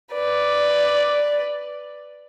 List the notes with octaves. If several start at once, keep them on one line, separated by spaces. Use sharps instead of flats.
B4 D5